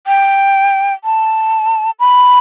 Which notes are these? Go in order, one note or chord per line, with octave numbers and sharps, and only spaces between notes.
G5
A5
B5